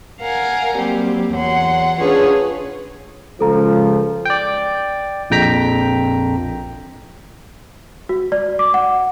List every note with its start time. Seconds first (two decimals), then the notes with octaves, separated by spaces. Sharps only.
0.21 A#4 F5 F#5 G#5
0.75 F#3 G3 A#3 C4 G4
1.32 E2 F#3 F#5 C6
1.99 C#4 D4 F4 G#4 B4 C#5
3.40 C#2 F3 A4 A#5
4.25 D5 G5
5.30 A#1 F2 G5 A#5 B6
8.09 F#4
8.32 D5
8.59 D6
8.74 F#5